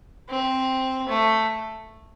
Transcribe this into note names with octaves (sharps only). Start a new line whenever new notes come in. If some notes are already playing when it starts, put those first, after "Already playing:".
C4
A3